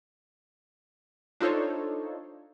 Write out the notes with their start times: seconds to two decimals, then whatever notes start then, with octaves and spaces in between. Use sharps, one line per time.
1.40 D4 D#4 F4 A4 C5 C#5